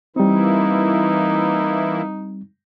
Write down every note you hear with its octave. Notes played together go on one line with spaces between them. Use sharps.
E3 G3 A#3 C4 D#4 E4